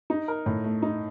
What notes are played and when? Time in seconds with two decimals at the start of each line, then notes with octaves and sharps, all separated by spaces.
0.10 D#4
0.28 A#4
0.46 A2
0.64 A3
0.83 D#4